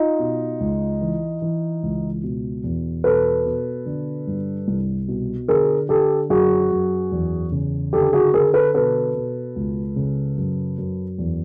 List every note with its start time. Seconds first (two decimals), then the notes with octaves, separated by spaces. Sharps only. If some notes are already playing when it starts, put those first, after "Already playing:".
Already playing: D#4 F4
0.19 B2
0.60 C#2
1.01 E3
1.42 E3
1.83 C#2
2.23 B2
2.64 E2
3.04 B2 A4 B4
3.45 B2
3.86 D3
4.27 G2
4.68 C2
5.08 B2
5.48 D3 G#4 A#4
5.89 D3 G4 A4
6.30 F#2 F#4 G#4
6.71 F#2
7.12 E2
7.52 C#3
7.93 D3 G4 A4
8.13 F#4 G#4
8.34 D3 G#4 A#4
8.54 A4 B4
8.74 B2 A4 B4
9.15 B2
9.56 C#2
9.96 C#3
10.37 F#2
10.78 F#2
11.18 E2